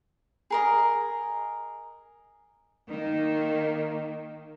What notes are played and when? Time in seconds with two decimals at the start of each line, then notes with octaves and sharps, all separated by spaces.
0.50 G#4 A#4 D#5
2.88 D#3 A#3